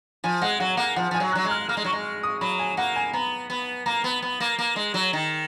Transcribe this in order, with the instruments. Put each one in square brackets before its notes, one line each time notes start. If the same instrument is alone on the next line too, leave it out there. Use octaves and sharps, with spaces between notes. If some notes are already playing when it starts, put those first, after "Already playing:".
[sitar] F3 [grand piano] G#5
[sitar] G#3 [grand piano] F#5
[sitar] F#3 [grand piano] F#5
[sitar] A#3 [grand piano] F#5
[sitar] F3 [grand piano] F#5
[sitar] F3 [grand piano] G#5
[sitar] F#3
[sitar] F#3 [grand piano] F#6
[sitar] G#3
[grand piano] F6
[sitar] A#3 [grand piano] F6
[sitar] G#3
[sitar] F#3 [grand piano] C#6
[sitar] G#3
[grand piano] D#6
[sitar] F#3 [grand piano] B5
[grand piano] G#5
[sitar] A#3 [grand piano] F#5
[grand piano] G#5
[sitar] B3 [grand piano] A#5
[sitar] B3
[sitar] A#3 [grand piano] A#5
[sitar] B3
B3
A#3
A#3
G#3
F#3
D#3